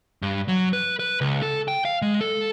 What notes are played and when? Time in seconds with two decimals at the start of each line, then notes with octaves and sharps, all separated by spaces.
0.22 G2
0.48 F#3
0.73 B4
0.99 B4
1.21 C#2
1.42 A4
1.68 G5
1.85 F5
2.02 G#3
2.21 A4